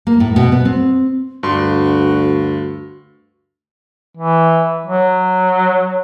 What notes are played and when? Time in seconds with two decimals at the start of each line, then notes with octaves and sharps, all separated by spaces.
0.07 A#3
0.20 A2
0.36 B2
0.52 B3
0.65 C4
1.43 D2 G2 F#4 C6
4.17 E3
4.87 F#3